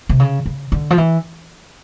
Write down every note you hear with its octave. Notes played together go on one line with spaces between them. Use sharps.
C3
C#3
C#3
D3
F3
E3